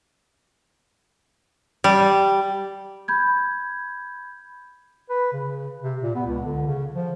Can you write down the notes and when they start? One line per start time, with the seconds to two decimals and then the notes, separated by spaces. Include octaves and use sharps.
1.84 G3
3.08 B5 G6 G#6
5.10 B4
5.33 C#3
5.83 C3
6.03 A#2
6.16 B3
6.27 C#2
6.45 D3
6.67 C#3
6.95 F3